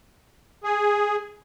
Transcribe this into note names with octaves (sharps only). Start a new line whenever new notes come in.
G#4